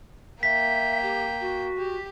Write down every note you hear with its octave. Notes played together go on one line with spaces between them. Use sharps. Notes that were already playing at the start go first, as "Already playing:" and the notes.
A#3 E5 G5 B6
G4
F#4
G4